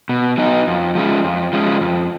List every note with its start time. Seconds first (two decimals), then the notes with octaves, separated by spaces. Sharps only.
0.09 B2
0.38 F#3 B3 D#4
0.67 F2
0.95 F3 G#3 C#4
1.24 F2
1.53 F3 G#3 C#4
1.81 F2